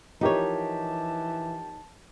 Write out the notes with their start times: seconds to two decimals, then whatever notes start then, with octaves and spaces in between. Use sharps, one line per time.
0.21 E3 F3 D#4 G4 A#4 C#5 A5